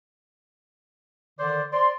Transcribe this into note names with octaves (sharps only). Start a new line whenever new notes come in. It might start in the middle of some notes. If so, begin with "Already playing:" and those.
D3 D#3 C5 D5
C5 D5 C6